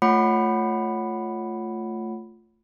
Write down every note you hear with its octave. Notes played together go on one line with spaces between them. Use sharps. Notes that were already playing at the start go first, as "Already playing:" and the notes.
A3 F4 C#5 F#5 B5 C#7